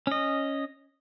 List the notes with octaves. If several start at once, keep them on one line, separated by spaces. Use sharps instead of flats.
C#4 D#5